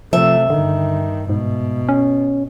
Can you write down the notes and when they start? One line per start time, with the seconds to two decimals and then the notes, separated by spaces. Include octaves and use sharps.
0.13 C3 F3 A3 E5
0.50 G2 D3 D#3
1.29 G#2 B2
1.89 C#4